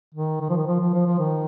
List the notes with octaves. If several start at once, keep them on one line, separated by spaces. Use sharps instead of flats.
D#3
D#3
F3
D#3
F3
F3
F3
F3
D#3